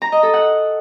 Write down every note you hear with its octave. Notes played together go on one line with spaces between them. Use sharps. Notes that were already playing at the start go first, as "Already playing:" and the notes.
A#5
D#5
A4
F#5